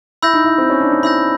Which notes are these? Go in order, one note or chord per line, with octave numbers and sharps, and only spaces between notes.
E4 B5 E6 G6 A#6
D#4
E4
C4
C#4
D4
D#4
E4 B5 E6 G6 A#6